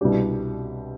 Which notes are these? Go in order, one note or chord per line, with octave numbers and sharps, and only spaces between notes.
C2 B2 G3 D4 G4